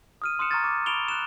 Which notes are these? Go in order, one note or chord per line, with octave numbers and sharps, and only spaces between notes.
D#6 F6 D#7
C6 D#6 F#6 C#7 E7
A#5 C6 C#6 F6 G#6 A6
D6
B5 C#6 D7 E7 F7 G7
F#6 E7